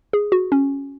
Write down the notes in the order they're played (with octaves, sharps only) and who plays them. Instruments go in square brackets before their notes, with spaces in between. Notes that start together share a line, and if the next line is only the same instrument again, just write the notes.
[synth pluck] G#4
F#4
C#4